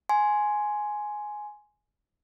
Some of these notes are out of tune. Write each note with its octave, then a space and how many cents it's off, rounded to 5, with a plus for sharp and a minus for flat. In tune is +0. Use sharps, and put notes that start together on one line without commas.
G#5 +10 C6 +0